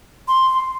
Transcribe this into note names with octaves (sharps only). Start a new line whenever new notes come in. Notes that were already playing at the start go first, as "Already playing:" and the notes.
C6